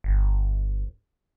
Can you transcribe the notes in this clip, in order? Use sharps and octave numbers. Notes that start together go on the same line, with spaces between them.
G1